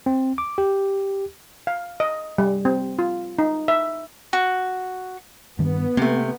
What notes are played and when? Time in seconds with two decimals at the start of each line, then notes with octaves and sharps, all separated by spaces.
0.06 C4
0.38 D6
0.58 G4
1.67 F5
2.00 D#5
2.38 G3
2.65 C4
2.99 F4
3.39 D#4
3.68 E5
4.33 F#4
5.59 G2 D#3 B3
5.97 C3 A3 A#3